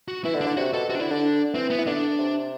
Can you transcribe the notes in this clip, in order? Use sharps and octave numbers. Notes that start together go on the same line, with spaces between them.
F#4
E3 E4
D3
D4
D3
C3 F#4
B2 A4
C3 F#4
D4
D3 E4
D3 D4
E3 C4
B3
E3
D3 D4
C3